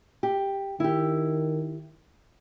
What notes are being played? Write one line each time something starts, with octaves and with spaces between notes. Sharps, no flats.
G4
D#3 E4 G4